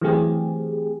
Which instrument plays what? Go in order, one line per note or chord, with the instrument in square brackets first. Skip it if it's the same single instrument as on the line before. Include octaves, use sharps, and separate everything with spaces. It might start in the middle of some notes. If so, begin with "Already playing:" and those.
[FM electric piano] E3 F#3 A3 C4 G4 G#4